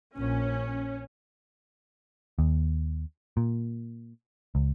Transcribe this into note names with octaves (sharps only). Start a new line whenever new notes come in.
A#1 C#4
D#2
A#2
C#2